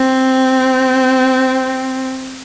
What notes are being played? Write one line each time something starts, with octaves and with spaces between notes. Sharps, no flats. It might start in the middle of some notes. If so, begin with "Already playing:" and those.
Already playing: C4